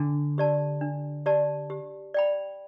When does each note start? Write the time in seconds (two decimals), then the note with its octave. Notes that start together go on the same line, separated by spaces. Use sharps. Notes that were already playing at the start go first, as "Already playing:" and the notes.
Already playing: D3 D4
0.38 G4 D5 A5
0.81 D4
1.26 G4 D5 A5
1.70 G4
2.14 D5 G5 B5